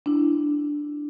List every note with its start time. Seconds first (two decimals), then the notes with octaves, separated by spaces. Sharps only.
0.06 D4 E4